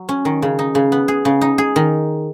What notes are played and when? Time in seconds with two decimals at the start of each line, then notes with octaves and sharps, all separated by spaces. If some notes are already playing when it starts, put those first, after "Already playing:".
Already playing: F#3
0.09 C#4
0.25 D#3
0.42 C#3
0.59 D#4
0.75 C#3
0.92 B3
1.08 G#4
1.25 C#3
1.41 D#4
1.58 G#4
1.76 D#3